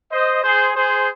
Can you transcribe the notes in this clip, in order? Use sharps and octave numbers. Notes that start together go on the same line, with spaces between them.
C5 D#5
G#4 C5
G#4 C5